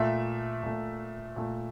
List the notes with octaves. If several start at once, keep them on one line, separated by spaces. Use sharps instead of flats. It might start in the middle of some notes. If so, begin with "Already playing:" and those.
Already playing: A#2 A3 E5
A#2 A3
A#2 A3